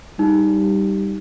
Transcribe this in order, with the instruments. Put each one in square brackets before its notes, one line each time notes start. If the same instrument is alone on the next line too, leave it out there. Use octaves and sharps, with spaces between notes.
[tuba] G3 [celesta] D#4